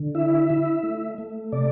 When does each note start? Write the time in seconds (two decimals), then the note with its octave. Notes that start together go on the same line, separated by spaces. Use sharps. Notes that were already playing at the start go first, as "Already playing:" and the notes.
Already playing: D3
0.15 E4 E5
0.50 E4
0.83 A3
1.18 A3
1.52 C3 D5